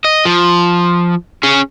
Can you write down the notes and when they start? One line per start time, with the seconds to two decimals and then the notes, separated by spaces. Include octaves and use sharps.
0.04 D#5
0.25 F3
1.43 C#4 G#4